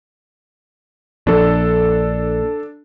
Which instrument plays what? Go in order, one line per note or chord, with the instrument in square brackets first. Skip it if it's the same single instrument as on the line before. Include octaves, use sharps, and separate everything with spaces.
[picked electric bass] A#1 [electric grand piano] D4 A4